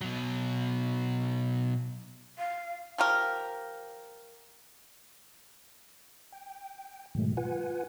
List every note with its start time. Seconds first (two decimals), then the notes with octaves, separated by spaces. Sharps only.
0.01 B2 F#3
2.39 F5
2.98 F3 G4 A#4
6.32 G5
7.15 G#2 B2 D#3 F#3 G#3 A3
7.37 F4 B4 F#5 G#5